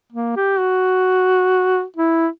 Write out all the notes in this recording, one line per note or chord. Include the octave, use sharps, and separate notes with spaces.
A#3
G4
F#4
E4